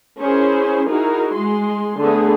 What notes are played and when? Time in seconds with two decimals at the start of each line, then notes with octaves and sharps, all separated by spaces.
0.20 C#4 E4 G#4 A#4 C5
0.87 D#4 E4 F#4 G#4 A#4
1.34 G#3 C6
2.00 D3 A3 B3 G#4